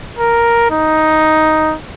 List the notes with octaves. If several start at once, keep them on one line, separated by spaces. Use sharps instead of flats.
A#4
D#4